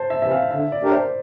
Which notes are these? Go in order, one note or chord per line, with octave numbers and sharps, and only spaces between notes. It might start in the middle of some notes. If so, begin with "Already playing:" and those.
Already playing: C5 A5
E5
C3 E3 E5
F5
D3 E5
D5
A3 D4 G4 A#4
C5